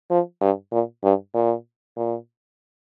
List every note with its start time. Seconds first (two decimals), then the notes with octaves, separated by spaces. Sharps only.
0.10 F3
0.41 G2
0.72 A#2
1.03 G2
1.35 A#2
1.96 A#2